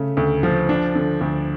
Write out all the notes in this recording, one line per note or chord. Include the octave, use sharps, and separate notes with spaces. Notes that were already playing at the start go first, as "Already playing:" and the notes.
Already playing: C#3 A3
D2
F3
D4
D3
D2